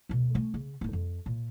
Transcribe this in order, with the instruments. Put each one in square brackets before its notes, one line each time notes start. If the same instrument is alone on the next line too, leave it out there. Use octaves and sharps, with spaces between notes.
[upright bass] D2 B2
A3 C#4
C#3
D1 D#4
F2
A#2